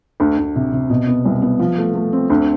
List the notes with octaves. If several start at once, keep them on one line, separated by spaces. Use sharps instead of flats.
D2
D2
C3
C3
B2
B3
C2
B3
F3
A3
A3
C4
D2